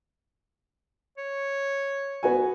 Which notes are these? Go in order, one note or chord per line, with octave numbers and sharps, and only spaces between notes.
C#5
B3 F#4 G#5